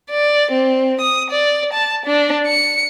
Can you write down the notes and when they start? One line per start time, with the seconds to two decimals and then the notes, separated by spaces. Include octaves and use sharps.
0.10 D5
0.52 C4
1.01 D#6
1.31 D5
1.73 A5
2.06 D4
2.47 C#7